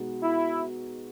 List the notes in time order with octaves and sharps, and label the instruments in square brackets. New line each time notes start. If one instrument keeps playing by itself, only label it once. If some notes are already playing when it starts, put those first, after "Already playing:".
Already playing: [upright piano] B2 G#3 B3 D#4 F#4
[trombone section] E4